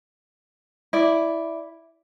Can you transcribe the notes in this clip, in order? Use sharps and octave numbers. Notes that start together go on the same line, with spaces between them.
E4 D5